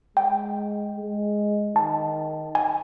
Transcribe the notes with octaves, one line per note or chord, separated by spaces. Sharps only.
G#3 G5
G#3
D#3 A5
G#5